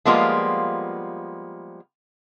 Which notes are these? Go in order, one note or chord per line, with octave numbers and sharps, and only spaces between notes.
F3 G3 G#3 A#3 B3 F4